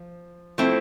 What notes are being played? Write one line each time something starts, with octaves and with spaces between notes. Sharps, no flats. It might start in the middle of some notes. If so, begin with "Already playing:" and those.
Already playing: F3
F3 A3 C4 E4